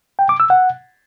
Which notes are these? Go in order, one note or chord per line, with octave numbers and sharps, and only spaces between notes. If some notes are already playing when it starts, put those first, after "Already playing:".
G5
D6
E6
F#5